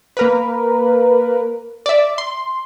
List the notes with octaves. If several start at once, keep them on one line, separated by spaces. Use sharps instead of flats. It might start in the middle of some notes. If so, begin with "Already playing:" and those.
A#3 A#4 B4
D5 E5
C6